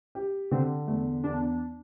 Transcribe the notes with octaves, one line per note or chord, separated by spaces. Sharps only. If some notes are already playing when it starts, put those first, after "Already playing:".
G4
D3 C4
E2 A3
E2 D4